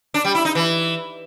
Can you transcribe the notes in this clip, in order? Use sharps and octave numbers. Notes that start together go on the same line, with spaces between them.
D4
G3
E4
D#4
E3